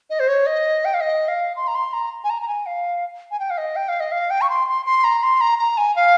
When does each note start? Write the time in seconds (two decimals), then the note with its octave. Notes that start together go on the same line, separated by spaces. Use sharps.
0.10 D#5
0.20 C5
0.28 C#5
0.46 D#5
0.85 G5
0.94 F5
1.01 D#5
1.28 F5
1.56 C6
1.68 A#5
1.75 C6
1.93 A#5
2.24 G#5
2.30 A#5
2.42 A#5
2.48 G#5
2.66 F5
3.31 G#5
3.40 G5
3.50 F5
3.58 D#5
3.76 G5
3.89 F5
4.00 D#5
4.12 F5
4.30 G5
4.41 C#6
4.50 C6
4.68 C6
4.86 C6
5.04 A#5
5.23 C6
5.41 A#5
5.59 A#5
5.77 G#5
5.96 F5